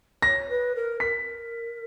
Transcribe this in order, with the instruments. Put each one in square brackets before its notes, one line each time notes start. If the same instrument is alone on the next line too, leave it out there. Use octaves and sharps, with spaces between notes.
[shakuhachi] C#5 [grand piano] A#6
[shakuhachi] B4
A#4
[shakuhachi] A#4 [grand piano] B6